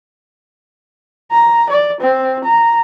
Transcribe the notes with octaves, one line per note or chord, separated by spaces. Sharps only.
A#5
D5
C4
A#5